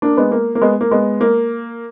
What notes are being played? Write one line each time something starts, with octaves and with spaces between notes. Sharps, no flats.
A#3 D4
G#3 B3
A#3
A#3
G#3 B3
A#3
G#3 B3
A#3